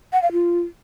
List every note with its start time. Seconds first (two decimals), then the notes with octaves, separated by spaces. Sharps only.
0.13 F#5
0.22 F5
0.32 F4